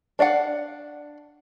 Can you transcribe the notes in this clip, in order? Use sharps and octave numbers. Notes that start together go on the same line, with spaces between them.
D4 D5 F5 F#5